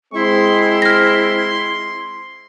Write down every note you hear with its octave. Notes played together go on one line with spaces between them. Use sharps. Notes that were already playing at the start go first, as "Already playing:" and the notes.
G#3 C4 E4 C6
F6 A#6